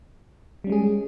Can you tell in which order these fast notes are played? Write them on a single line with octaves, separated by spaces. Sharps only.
G3 C#4 G#3 G#4